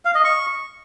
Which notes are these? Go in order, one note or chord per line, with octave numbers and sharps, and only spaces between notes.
F5
D#5
C#6